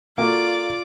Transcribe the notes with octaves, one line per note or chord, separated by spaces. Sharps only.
A#3 F4 F#4 A4 D5 D6